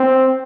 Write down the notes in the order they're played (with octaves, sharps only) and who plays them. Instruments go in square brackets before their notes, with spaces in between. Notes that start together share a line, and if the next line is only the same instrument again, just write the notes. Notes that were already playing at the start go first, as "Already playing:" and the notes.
Already playing: [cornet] C4